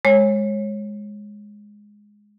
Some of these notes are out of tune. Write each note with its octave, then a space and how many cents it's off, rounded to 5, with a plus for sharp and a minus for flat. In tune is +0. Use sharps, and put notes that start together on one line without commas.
G#3 +0 C#5 -25